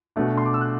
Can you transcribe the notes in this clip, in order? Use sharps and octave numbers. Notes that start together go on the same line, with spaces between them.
B2 A3 D4
C6
D6
E6
F#6